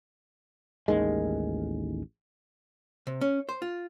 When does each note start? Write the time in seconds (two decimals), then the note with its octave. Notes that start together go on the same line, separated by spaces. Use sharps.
0.88 A1 D#2 D#3 G#3
3.07 C3
3.21 C#4
3.49 C5
3.62 F4